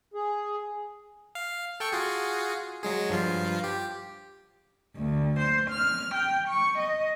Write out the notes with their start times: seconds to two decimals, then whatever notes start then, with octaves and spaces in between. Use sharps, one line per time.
0.14 G#4
1.35 F5
1.80 A4 G5 C#6
1.92 F4 F#4 G#4
2.83 F#3 G#3 G#4
3.10 G2 F3 F4
3.64 G4
4.96 D2
5.38 C5
5.70 F6
6.14 G5
6.48 C#6
6.79 D#5